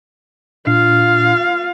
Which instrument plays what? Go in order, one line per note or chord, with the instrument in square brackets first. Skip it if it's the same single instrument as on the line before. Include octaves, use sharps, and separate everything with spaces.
[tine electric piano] A#2 D4 C7 [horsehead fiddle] F4 F5